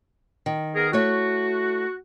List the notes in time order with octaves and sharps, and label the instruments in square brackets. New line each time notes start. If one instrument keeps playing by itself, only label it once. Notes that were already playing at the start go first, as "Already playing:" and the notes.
[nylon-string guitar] D#3
[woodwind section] B3 G#4 A#4
[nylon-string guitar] A3 E4 C#5 [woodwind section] F#4